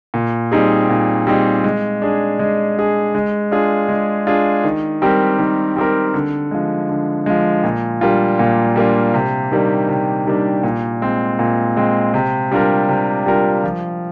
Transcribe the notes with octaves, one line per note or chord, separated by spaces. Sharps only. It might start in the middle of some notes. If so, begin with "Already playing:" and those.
A#2
G3 C4 D#4 G#4
A#2
G3 C4 D#4 G#4
G#3
D4 G#4
G#3
D4 G#4
G#3
D4 F4 G#4
G#3
D4 F4 G#4
D#3
G3 C4 G4 A#4
D#3
G3 C4 G4 A#4
D3
F3 G#3
D3
F3 G#3
A#2
G3 A#3 D4 F4
A#2
G3 A#3 D4 F4
C3
D#3 G3 A#3 D4
C3
D#3 G3 A#3 D4
A#2
G#3 C4
A#2
G#3 C4
C3
G3 D4 F4 A#4
C3
G3 D4 F4 A#4
F3